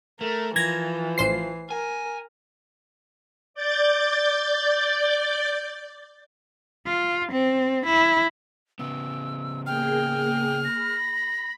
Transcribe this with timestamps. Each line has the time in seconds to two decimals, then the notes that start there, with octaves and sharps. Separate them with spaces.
0.21 A3 A#4
0.56 E3 F3 G#6 A#6
1.18 A1 C5 C7
1.71 A#4 G#5
3.54 D5 G6 A6
6.87 F4
7.32 C4
7.86 E4
8.79 C#3 B3 E6
9.66 A#3 G#4 G5 F6
10.64 B5 A#6